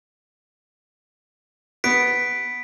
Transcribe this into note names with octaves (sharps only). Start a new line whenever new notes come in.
B3 B6 D7